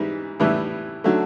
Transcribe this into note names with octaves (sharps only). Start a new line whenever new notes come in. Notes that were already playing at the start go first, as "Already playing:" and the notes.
Already playing: G#2 E3 G3
A2 E3 G3
D3 F#3 A3